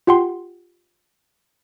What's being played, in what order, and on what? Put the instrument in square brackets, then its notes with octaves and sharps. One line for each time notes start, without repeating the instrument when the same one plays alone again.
[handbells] F4 G4 F#5 G5 C6